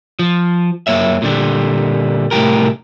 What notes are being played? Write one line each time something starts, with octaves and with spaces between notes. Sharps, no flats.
F3
F#2 A#3 C#5 E5
A#2 D3 G3
C2 A2 E3 G4 A#4